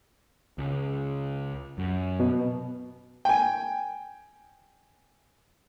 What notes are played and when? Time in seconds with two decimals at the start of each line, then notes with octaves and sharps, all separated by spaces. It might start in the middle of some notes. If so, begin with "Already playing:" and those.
0.58 C#2
1.78 F#2
2.20 B2
3.25 G5 G#5